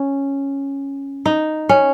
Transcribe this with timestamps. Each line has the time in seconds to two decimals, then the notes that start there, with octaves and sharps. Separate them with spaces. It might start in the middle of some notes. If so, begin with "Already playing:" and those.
Already playing: C#4
1.26 D#4
1.69 C#4